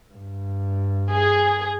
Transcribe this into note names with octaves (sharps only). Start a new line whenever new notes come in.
G2
G#4